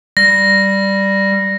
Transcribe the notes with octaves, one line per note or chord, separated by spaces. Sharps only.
G3 A#6